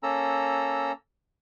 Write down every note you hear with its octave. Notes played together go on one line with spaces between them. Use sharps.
A#3 C#4 A4 A#5 E6